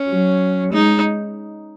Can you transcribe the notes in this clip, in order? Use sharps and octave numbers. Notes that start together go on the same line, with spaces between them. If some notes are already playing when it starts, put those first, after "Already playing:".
Already playing: C#4
F#3
G#3 D#4